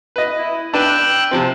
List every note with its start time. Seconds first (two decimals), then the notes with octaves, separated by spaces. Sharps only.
0.16 B4 D#5
0.37 E4
0.74 D4 B4 G5 E6 F#6
1.31 C3 F3 C4